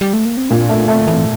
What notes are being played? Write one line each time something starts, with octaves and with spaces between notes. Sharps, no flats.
G3
A3
A#3
C4
A#2 D4
A3
C3 A3
D3
E3 A3